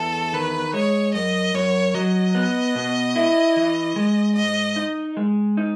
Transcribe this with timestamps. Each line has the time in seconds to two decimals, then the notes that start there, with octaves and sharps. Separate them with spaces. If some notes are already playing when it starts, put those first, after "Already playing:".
Already playing: E2 A4
0.33 D#3 B4
0.74 G#3 C#5
1.14 F#2 D#5
1.54 F#2 C#5
1.94 F#3 D#5
2.35 B3
2.76 B2
3.16 E4
3.56 E3
3.96 G#3
4.36 G#2 D#5
4.76 D#4
5.17 G#3
5.57 D#4